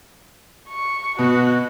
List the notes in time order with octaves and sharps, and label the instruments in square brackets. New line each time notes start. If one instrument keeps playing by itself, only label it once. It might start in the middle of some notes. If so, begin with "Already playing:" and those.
[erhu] C#6
[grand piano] B2 [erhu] F#4